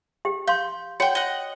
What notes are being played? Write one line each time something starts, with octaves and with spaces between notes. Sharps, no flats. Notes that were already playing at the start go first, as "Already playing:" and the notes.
G4 G5
F5 C6 G6
F#4 C#5 F#5 G5
D#5 F#5